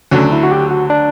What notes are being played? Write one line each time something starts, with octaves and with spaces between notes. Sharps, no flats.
D2 D3 F#3 C#4
E4
F#4
G4
F#4
D4